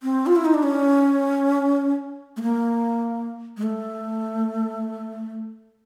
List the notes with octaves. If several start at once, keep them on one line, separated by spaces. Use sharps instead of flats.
C4
F4
E4
D#4
D4
C#4
A3
A#3
G#3
A3